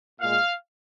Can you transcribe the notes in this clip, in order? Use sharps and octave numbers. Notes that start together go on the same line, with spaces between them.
A#2 G#3 F5